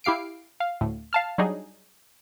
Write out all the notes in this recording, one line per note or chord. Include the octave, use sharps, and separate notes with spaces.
E4 G4 F5 C7 D7
F5
D2 A2
F5 A5 F6
F#3 G3 D4 D#4 G#4